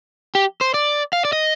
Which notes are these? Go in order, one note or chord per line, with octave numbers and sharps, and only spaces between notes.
G4
C5
D5
F5
D5
D#5